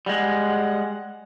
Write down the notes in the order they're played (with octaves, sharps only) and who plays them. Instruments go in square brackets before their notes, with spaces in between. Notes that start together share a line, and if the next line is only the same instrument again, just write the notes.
[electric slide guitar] G3 G#3 [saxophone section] F#5